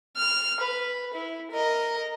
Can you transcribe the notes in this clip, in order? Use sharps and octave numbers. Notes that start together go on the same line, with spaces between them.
F6
B4
E4
A#4 D#5